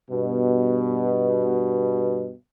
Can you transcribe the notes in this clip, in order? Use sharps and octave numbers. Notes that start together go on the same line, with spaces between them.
G2 B2